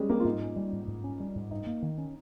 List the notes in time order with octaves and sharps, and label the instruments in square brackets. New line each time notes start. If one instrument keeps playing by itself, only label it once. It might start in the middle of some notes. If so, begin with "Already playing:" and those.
Already playing: [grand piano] G3 G#3 C#4
[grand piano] A#3 [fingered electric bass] C4
[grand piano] F4
[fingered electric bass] G#2 [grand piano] D#4
[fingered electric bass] C#4
G3
G#2
G#2
C#4
G3
G#2
[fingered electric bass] G2 [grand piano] D#4
[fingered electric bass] A#3
D#3
C#4